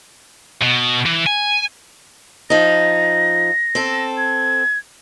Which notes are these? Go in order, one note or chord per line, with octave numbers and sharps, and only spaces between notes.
B2
E3
G#5
F3 D#4 A#6
C4 A4
G#6